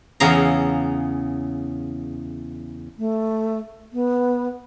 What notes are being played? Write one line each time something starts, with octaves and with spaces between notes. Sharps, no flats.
E2 C#3 F5 A#5
A3
B3